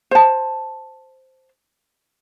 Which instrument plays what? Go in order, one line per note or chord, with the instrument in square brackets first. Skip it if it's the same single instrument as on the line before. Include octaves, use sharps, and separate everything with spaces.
[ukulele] C5 A5